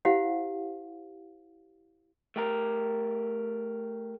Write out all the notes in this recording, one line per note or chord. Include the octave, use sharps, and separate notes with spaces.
E4 G4 C5 F5 F#5
A3 G4 A#4